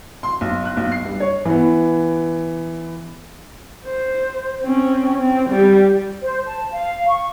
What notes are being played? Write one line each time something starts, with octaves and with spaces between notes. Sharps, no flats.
C6
B1
F#6
B1
C7
G2
C#5
E3 B3
C5
C4 C#4
C4
G3 G4
C5
A5
F5
C#6